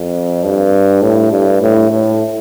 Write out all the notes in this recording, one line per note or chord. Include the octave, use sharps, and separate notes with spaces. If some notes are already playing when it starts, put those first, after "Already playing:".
Already playing: F2
G2
A2
G2
A2
A2